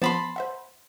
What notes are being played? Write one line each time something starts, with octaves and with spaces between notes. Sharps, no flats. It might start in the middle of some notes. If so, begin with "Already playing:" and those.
F3 B3 A5 B5 C6
C5 E5 F#5